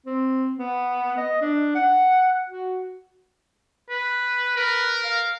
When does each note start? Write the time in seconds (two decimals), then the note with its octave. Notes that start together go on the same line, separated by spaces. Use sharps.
0.06 C4
0.57 B3
1.17 D#5
1.41 D4
1.75 F#5
2.50 F#4
3.90 B4
4.57 A#4 B4
5.04 F5